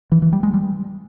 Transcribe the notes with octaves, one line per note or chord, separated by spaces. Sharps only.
E3
E3
G3
G#3
G3